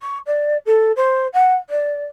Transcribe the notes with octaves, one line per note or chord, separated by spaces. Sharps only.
C#6
D5
A4
C5
F#5
D5